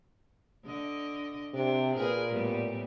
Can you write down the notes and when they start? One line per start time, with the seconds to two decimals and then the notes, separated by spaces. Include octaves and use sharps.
0.64 D3 D#5
1.54 C3 D4
1.96 A#2 G#4 A#4 B4
2.32 A2 G3 B3